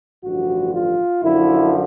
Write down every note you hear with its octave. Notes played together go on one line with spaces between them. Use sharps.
A1 G2 D3 F3 F#4
F4
F#2 D3 F3 E4